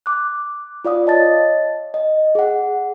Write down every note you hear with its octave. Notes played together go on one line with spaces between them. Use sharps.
D6 F#6
F4 D5 F5 D#6
C#5 D#5 A5 A6
D#5
G#4 F#5